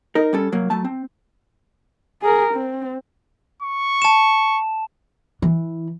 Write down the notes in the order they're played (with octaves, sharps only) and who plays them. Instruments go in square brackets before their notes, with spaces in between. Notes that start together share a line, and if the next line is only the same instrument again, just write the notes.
[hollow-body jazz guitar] D#4 A#4
G3 C#4 A4
C2 F#3 A#3
F#3 A3 A5
C4
[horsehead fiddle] G#4 A#4
C4
[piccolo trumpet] C#6
[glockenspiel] A5 E7
[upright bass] E3